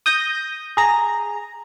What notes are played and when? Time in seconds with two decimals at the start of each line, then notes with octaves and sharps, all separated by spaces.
0.06 D#6 G6 A#6
0.77 G#4 A#5